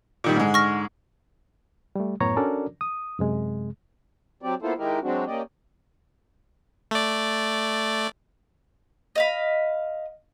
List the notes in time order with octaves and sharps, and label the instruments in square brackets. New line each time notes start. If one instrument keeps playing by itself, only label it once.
[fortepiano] A#2 D#3 G3
G#2 D3 G#3
[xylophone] C#6 F6 A#6
[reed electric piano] G3 A3
F#2 A2 B3 C#5 A#5 C#6
C#4 D4 F#4 A4 A#4 D5
D#6
F#2 C3 G#3
[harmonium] F#3 C4 G4 D5
A#3 B3 E4 F4 A4 C5
D#3 G#3 D#4 E4 G4 A#4
F#3 G#3 C4 D4 F#4
A#3 C#4 G4 D5 D#5
[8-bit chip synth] A3 D5
[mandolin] D#5 F5 B5